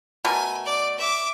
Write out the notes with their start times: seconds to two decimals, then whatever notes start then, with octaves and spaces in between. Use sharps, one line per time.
0.25 B2 A3 A#4 G#5
0.65 D5
0.98 E5 D6